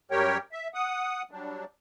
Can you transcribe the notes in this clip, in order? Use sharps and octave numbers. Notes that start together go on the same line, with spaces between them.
F#2 G3 G4 A#4 C#5 G5
E5
F#5 D#6
F#3 G3 D4